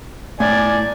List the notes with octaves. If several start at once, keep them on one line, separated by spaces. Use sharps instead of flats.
A2 D5 G#5